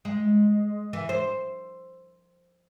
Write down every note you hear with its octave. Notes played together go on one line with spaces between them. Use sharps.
G#3
E3
C5